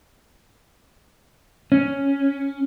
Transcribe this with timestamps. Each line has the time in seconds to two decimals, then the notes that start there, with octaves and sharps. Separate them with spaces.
1.72 C#4